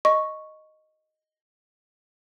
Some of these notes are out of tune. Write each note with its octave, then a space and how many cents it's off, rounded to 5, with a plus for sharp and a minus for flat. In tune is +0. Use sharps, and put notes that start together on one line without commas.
D#5 +0 C#6 +0